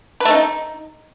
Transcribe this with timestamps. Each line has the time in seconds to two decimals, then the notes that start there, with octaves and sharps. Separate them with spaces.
0.20 B4
0.25 A3
0.30 D#4